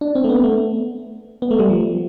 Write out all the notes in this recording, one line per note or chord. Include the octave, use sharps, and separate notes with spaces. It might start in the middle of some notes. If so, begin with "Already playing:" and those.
D4
C4
A3
B3
A3
B3
A3
G3
F3